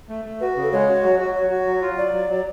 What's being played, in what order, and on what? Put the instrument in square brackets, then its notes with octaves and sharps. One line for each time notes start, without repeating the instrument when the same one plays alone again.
[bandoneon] A3
A3
[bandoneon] F#4 [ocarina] B4
[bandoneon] C#3
[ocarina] A4
[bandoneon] G#3 [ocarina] C#5
[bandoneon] F#4
F#3
F#4
[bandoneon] F#4 [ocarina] C#5
[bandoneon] F#4
F#3
F4
[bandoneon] F#3 [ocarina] D5
[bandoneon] F#3
F#3